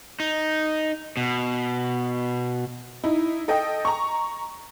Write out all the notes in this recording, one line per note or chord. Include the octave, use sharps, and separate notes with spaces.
D#4
B2
D#4 E4
A4 D#5 G5
A#5 C#6